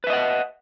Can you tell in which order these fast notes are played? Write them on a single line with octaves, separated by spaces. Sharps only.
B4 E5 D#5 F#5